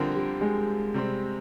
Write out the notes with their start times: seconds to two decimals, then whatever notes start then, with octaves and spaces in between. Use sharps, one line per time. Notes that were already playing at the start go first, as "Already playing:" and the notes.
Already playing: D3 F3 G3 C4 G4 A#4
0.15 G3
0.41 G#3
0.94 C3 G3 C4